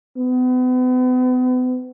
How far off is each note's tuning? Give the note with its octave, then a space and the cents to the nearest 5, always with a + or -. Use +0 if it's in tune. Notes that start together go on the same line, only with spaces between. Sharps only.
B3 +40